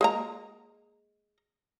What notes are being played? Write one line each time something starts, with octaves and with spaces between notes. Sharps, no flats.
G#3 A#3 A#5